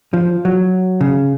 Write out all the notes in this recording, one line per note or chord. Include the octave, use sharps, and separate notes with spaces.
F3
F#3
C#3